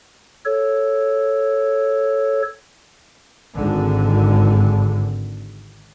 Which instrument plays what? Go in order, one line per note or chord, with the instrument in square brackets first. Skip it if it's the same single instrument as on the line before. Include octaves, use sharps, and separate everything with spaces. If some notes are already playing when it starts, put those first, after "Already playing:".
[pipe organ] A4 C#5
[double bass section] G#1 D3